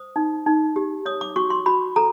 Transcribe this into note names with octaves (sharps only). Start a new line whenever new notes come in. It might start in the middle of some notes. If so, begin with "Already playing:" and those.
Already playing: C5 D#6
D#4
D#4
G4
C#5 D#6
D6
F#4 C#6
C6
F#4 B5
A4 A#5